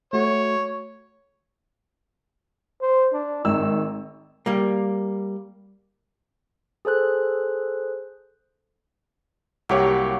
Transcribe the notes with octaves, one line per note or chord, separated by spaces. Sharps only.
A3 F#4 C#5
C5
D4
G#1 D#3 E6
G3 A#3
G#4 A4 C5 F#6
C2 F#3 A#3 G4 C#5